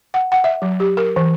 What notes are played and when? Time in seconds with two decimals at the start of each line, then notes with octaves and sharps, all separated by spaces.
0.14 F#5
0.32 F#5
0.44 E5
0.62 F#3
0.80 G4
0.97 A#4
1.16 E3